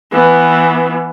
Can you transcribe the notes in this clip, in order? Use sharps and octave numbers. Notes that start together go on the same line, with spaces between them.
E3 B3